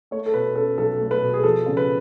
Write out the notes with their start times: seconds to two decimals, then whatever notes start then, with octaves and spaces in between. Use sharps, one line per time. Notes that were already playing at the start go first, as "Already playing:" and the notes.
0.11 A3 C#5
0.26 A4
0.34 B2 B4
0.55 C#4 A4
0.78 B1 A4
1.00 A3
1.11 B4
1.22 B2
1.34 G#4
1.44 F3 A4
1.66 C#3
1.77 B4